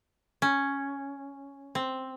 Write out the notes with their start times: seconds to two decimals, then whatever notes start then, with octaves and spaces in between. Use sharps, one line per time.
0.42 C#4
1.75 C4